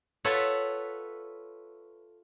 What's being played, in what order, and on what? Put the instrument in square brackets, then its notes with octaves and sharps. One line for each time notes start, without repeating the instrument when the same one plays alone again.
[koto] F4 A4 B4 C#5 E5 F#5